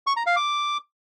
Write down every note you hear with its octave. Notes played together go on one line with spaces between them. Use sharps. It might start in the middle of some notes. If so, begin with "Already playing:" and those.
C#6
A#5
F5
D6